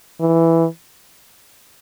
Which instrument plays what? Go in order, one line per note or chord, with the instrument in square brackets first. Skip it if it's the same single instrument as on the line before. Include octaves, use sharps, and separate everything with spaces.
[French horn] E3